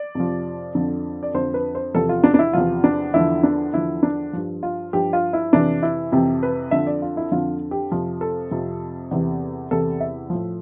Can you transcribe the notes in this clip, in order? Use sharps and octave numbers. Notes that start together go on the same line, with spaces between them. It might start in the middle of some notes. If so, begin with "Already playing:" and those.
Already playing: D5
F2 C3 F3
F2 D3 F3
D5
F2 D3 F3 C5
B4
C5
E2 C3 F3 A4
F4
D4
D4
E4
E2 C3 F3 F4
D4
E2 D3 F3 E4
D4
E2 D3 F3 E4
D4
G2 F3
F4
G2 F3 G4
F4
E4
F2 C3 E3 D4
E4
F2 C3 E3 G4
B4
F2 D3 F3 E5
D5
F4
E4
F2 D3 F3 F4
G4
F2 C3 F3
A4
F2 C3 F3
E2 C3 E3
E2 C3 E3 A4
E5
A2 F3